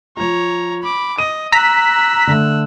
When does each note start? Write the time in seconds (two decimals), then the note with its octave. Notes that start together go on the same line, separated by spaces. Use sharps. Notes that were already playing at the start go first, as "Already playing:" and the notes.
0.17 F3 F4 C#5 A#5
0.83 B5 D6
1.18 D#5 D#7
1.52 A#5 E6 F#6 B6
2.27 D3 A3